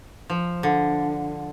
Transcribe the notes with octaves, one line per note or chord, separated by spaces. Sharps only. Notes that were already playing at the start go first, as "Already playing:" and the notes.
F3
D3